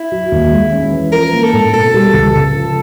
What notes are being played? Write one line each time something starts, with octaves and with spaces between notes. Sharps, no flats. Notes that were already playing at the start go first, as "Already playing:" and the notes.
Already playing: E4
F#3
D#2
G#3
C#4
E3
F3 A#4
A#3
A4
G#2
B2 A4
G3
C#2
C#3 A4
F3